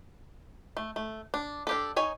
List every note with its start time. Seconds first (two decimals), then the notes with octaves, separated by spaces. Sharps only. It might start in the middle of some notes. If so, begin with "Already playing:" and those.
0.77 A3
0.96 A3
1.34 D4
1.67 D4 G4 A4
1.96 D#4 C#5 G#5